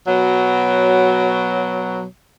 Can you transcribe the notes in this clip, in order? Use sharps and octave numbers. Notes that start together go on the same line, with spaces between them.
B2 F#3